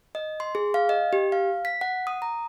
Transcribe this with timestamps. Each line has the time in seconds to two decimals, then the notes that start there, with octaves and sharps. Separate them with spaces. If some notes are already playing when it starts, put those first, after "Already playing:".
0.15 D#5
0.40 C6
0.55 G#4
0.74 F5
0.89 D#5
1.13 G4
1.32 F5
1.65 B6
1.81 F#5
2.07 D#6
2.22 A#5